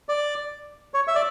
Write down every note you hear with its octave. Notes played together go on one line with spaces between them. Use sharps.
D5
C#5
E5
D5